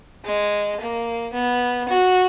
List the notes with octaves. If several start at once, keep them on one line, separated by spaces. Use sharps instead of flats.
G#3
A#3
B3
F#4